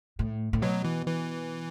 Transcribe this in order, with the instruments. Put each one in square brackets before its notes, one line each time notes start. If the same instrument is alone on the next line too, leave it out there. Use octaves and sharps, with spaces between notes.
[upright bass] A2
A2
[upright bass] B2 [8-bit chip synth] F#3
[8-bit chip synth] E3
E3